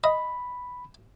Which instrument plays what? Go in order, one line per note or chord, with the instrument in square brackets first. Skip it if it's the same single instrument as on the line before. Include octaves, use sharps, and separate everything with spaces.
[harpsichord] D#5 [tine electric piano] B5